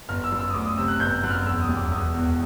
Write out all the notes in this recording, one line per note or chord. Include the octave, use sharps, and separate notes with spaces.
G1 F6
E6
F#2
E6
D#6
D2 D6
D#6
C3 E6
F#6
G1 G6
F#2 F#6
F6
E1 E6
D#6
D#2
D6
E1 D#6
E2